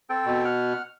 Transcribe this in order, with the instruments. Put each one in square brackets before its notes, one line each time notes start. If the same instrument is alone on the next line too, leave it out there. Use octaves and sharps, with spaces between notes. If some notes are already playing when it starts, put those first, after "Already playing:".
[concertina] C4 A4 G5
[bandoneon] B2
[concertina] F#5 F6